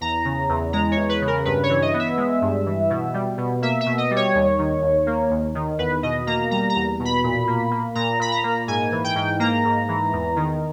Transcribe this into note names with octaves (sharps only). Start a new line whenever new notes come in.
E2 A#5
C#3
E2
G#3 A#5
C#5
E2
B4
C#3
A#4
G2 B4
C#5
E3
D#5
B3
E5
G#3
G2
E3
B2
G3
B2
A#3 E5
E5
B2
D#5
G3
C#5
D#2
D#3
D#2
A#3
D#2
D#3
E2 B4
B2 D#5
A#3 A#5
G3 A#5
A#5
E2
B2
B5
A#2
A#3
A#3
A#2 A#5
A#2 B5
A#5
A#3
G#2 G#5
E3
G5
G#2
A#3 A#5
G#2
E3
E2
D#3